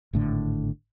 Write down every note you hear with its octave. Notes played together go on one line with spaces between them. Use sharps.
G#1 A2 D3